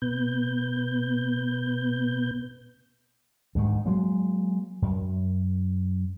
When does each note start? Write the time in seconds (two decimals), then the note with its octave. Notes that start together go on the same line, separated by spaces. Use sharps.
0.02 B2 B3 G6
3.55 D2 G#2 D#3
3.86 F#3 G#3 A#3
4.82 F#2